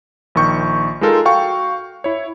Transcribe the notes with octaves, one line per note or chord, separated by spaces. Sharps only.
A#1 D#3 C#6 G6
G#3 D#4 F4 A4 A#4
F#4 F5 G5 C#6
E4 C#5